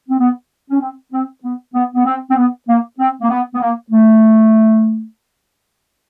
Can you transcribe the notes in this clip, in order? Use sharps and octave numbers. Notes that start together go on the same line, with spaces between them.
C4
B3
C#4
C4
C4
B3
B3
B3
C4
C4
B3
A#3
C4
A#3
B3
B3
A#3
A3